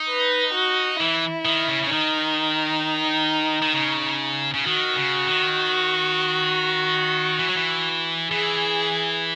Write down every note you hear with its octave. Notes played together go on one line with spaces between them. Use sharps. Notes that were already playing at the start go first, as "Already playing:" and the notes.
Already playing: D#4
B4
F#4
E3 E4
D#3
C#3
C#3
D#3 D#4
D#3
C#3
C#3
D#3 F#4
C#3
D#3
E3
F#3
E3
E3 G#4